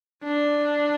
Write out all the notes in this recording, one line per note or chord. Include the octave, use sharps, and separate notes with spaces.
D4